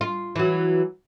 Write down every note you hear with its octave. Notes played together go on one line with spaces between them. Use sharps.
F4
E3 F#3